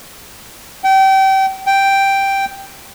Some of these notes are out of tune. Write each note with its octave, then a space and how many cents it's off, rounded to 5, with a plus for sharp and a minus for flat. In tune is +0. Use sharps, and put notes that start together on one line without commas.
G5 -30
G5 +0